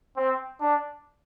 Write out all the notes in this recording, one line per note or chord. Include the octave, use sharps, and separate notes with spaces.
C4
D4